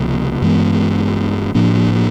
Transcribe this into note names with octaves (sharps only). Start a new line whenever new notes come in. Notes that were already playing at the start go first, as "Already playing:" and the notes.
Already playing: C#2 C3 F3 A#3
G2 E3 G#3 B3
A2 F3 A#3 D4